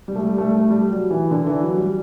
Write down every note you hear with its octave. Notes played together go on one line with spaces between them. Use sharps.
G3
A3
G3
A3
G3
A3
G3
F#3
E3
D3
E3
F#3
G3